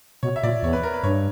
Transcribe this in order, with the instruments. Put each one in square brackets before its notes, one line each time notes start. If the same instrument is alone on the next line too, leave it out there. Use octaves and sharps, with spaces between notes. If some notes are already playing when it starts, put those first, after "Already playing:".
[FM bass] B2 [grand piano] C#5
[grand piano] E5
[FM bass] A#2 [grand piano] D5
[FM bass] E2 [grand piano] C#5
[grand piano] B4
A#4
B4
[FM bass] G2 [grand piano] C#5